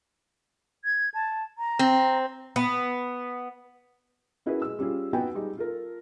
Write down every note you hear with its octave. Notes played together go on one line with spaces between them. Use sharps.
G#6
A5
A#5
C4
B3
C#4 E4 F#4 G#4 A#4 B4
G#3 E6
G3 C#4 F4 G#4
B3 D#4 F#4 G5 G#5
G3 G#3 D#4
F4 A4 A#4